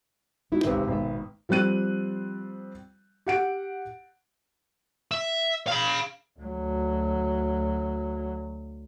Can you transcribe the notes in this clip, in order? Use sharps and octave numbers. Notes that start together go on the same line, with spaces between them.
D#4 E4 F#4
G#1 C#2 C3 B4 C5 E5
G#1 B2 B3 E5
F3 G3 C4 F#6 D#7
G4 F#5 D7
E5
F5 B5
D2 F#3